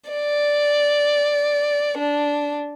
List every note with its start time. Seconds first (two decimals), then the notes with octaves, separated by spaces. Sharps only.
0.10 D5
1.98 D4